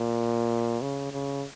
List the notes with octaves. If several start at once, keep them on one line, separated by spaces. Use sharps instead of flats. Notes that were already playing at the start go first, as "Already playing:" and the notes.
Already playing: A#2
C#3
C#3